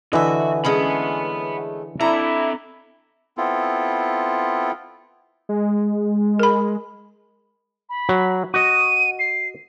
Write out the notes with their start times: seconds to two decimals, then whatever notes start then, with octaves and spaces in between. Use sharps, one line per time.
0.13 D3 E3 F#4 D#5 E5
0.65 G#3 A3 C#4 F#5 B5
2.01 C4 D4 E4 A4 A#5
3.38 B3 C4 E4 F4 A4
5.49 G#3
6.39 A#4 B5
7.89 B5
8.09 F#3
8.54 F#4 D#5 D#7
9.19 C7